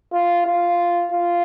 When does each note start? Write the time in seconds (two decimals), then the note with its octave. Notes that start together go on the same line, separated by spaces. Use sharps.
0.13 F4
0.46 F4
1.12 F4